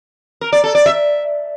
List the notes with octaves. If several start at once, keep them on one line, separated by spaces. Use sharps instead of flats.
A#4
D5
A4
D5
E5